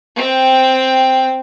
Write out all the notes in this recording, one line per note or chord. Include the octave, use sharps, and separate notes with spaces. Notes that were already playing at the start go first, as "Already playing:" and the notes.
C4 G5